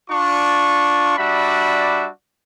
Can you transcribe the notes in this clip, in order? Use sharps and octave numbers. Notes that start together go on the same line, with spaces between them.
D4 F4 C#6
G3 D4 F#4 D5 E5 B5